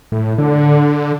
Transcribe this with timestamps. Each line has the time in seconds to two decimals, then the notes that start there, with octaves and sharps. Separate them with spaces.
0.12 A2
0.38 D3